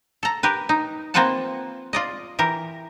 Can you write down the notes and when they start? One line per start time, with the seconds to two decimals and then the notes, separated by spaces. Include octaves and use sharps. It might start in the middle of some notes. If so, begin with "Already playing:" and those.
0.23 A4 A#5
0.43 G4 A#4 B4
0.69 D#4
1.14 A#3 C4 F4 B4 F#5 A5
1.93 F4 D5 D#5
2.39 E3 G4 A#4